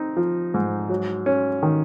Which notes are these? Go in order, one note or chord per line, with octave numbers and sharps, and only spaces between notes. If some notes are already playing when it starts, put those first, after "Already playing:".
Already playing: C4 D#4
F3
G#2
F#3
C#4
D#3